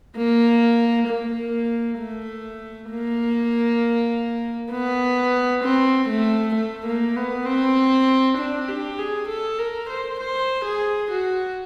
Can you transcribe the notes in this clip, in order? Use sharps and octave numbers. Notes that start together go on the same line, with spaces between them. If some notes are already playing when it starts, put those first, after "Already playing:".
A#3
A#3
A3
A#3
B3
C4
A3
A3
A#3
B3
C4
D4
G4
G#4
A4
A#4
C5
C5
G#4
F#4